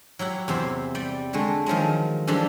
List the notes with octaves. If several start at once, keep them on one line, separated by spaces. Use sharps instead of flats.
F#3 E4 G4 F#5
E2 C3 E4 C5
G3 D5 G5
D3 G#3 A3
D#3 F3 F#3 G#3
E3 F3 G3 D4 G4 A4